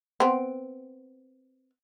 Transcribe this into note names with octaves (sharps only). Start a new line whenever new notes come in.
B3 C4